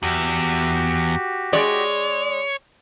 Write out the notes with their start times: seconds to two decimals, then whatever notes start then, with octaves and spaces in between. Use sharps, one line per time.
0.03 E2 F#4 G4
1.53 G#3 C#5 D5